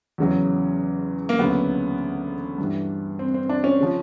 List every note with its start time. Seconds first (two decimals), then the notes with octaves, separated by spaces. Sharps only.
0.18 E2 C#3 F#3
1.29 A#3
1.38 D2 C#3 F#3 B3
2.58 G2 E3
3.19 C4
3.34 C4
3.49 D4
3.64 C#4
3.80 C#3 F3